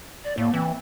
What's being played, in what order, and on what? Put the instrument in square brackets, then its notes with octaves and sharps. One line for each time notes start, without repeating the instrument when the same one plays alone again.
[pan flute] D5
[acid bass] A2 [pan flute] A#3
[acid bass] E3 [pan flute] C4